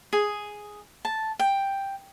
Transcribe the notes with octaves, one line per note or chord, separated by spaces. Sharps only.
G#4
A5
G5